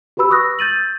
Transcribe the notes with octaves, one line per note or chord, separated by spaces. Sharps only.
F#4 G4 B4 B5 E6
C#6 D#6 E6 F#6 A#6
G6 A6 D#7 F#7